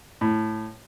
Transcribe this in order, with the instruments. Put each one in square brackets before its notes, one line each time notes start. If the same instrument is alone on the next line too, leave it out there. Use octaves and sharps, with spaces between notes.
[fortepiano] A2